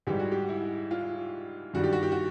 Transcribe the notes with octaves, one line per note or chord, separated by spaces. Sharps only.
G#2 E3 G3 G4
F#4
G4
E4
F4
G2 D#3 G3 F#4
G4
F#4
G4
F#4